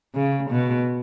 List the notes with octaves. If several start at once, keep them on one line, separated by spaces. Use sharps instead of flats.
C#3
B2